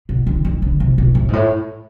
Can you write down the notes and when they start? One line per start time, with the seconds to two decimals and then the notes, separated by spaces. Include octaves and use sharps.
0.09 B2
0.27 D3
0.45 D#3
0.62 D3
0.80 C3
0.98 B2
1.15 A2
1.28 G#2
1.33 A2